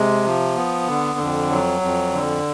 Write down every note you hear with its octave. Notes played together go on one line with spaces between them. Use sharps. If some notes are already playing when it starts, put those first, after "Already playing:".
Already playing: C3 G#3
F3
B3
D3
F2
F#3
F2
D3